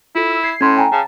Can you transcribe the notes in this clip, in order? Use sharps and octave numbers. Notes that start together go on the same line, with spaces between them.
E4 F4 A4
E6
G#6 C7
A2 C#4 C6 G#6
G5 G#5 A#5
C#3 A5